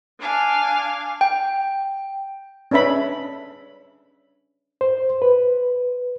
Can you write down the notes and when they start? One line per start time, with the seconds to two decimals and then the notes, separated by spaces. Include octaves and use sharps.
0.19 D4 F5 G#5
1.21 G5
2.71 C#4 D4 B4 E5 B5
4.81 C5
5.22 B4